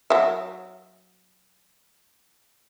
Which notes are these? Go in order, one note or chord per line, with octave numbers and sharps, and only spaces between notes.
F#3 E5